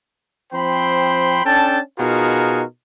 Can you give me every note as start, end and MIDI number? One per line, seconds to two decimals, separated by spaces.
0.53 1.40 53
0.53 1.40 60
0.53 1.40 72
0.53 1.40 79
0.53 1.40 83
0.53 1.40 84
1.45 1.79 61
1.45 1.79 62
1.45 1.79 69
1.45 1.79 79
1.45 1.79 81
1.98 2.63 47
1.98 2.63 63
1.98 2.63 65
1.98 2.63 66
1.98 2.63 68
1.98 2.63 70